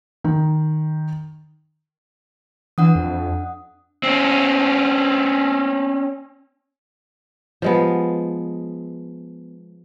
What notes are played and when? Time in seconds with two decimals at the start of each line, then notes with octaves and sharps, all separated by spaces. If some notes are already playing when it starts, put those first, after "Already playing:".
0.24 D#3
2.78 E3 D4 F#5 D#6
2.96 F2
4.03 C4 C#4
7.62 F3 G#3 B3